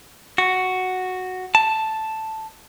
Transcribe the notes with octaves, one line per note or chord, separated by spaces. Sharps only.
F#4
A5